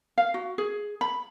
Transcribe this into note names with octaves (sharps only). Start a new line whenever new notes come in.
F5
F#4
G#4
B5